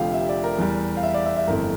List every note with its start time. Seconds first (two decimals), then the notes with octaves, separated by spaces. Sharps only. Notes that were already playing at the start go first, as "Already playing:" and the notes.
Already playing: F1 F2 D3 F3 G4 F5
0.14 E5
0.29 D5
0.44 A#4
0.58 E2 E3 G3
0.97 F5
1.03 E5
1.14 D5
1.26 E5
1.36 E5
1.48 G1 F2 E3 A3 A#4